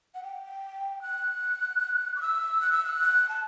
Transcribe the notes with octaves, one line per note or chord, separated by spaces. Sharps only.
F#5
G5
F#6
D6
E6
F#6
E6
F#6
A5